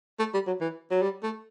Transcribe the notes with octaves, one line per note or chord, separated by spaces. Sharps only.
A3
G3
F#3
E3
F#3
G3
A3